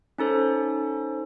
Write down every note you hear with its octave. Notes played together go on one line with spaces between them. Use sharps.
C#4 D#4 A4 C5